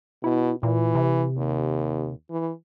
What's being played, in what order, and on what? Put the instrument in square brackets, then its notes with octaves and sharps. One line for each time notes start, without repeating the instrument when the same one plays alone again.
[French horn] B2 [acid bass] E4
[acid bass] A#2 [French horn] E3
[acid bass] C3
[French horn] D#2
E3